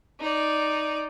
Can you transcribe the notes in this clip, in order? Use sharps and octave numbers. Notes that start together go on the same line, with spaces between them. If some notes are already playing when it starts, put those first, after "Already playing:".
D#4 D5